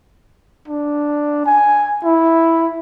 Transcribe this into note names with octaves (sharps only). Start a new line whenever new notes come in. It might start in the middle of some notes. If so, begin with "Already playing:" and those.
D4
G#5
E4